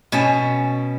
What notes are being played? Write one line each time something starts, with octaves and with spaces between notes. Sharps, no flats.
B2 C#4 A5